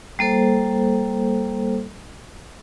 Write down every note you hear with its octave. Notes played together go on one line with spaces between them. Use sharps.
G3 A#3 A4 C5